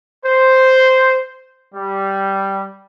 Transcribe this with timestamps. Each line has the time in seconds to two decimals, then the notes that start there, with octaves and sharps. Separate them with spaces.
0.25 C5
1.75 G3